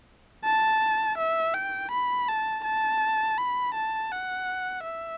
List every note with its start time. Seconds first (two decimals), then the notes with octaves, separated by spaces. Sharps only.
0.44 A5
1.18 E5
1.54 G5
1.91 B5
2.29 A5
2.65 A5
3.38 B5
3.74 A5
4.11 F#5
4.83 E5